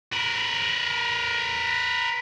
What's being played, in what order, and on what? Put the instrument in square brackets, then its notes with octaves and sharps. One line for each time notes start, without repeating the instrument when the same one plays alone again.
[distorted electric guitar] A#4 B4